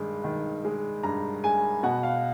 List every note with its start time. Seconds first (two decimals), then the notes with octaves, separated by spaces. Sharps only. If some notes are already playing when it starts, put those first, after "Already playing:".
Already playing: G2 D#3 G#3
0.24 D#3
0.65 G#3
1.03 G2 A#5
1.44 G#3 G#5
1.83 B2 F#5
2.03 F5